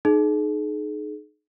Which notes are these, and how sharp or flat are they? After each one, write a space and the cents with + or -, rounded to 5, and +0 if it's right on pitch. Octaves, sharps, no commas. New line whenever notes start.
D#4 -25 G#4 +35